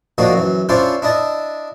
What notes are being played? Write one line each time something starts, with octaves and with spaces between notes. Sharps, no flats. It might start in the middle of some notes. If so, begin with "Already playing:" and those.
F3 A#3 D4 D#4 F#4
F#2 E3
C#4 D4 E4 F4 C5 D5
D4 E4 D#5 A5